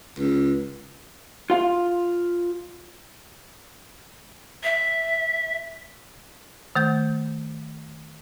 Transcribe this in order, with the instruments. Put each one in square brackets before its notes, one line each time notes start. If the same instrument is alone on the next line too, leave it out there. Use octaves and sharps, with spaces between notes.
[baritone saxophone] C#2
[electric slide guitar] F4 F5
[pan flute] E5
[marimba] D#3 A3 G6